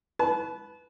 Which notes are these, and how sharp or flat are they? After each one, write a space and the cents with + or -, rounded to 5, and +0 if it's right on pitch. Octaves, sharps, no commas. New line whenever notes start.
B4 +0 A5 -35